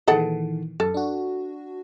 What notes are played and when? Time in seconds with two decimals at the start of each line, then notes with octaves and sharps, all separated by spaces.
0.07 A#2 D#3 E3 G#4 A4 F#5
0.80 F#2 A4
0.94 D4 F#4